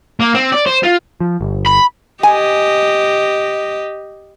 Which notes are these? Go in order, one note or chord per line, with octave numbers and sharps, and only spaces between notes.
A#3
C4
D5
C5
F4
F3
G1
B5
G4 D#5 G#5